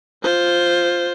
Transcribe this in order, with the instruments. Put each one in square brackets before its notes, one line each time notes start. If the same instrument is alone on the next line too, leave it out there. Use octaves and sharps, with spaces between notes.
[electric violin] F4 C5